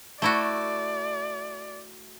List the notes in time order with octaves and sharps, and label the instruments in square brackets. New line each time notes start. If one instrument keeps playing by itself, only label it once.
[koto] A3 E4 F#4 [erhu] D5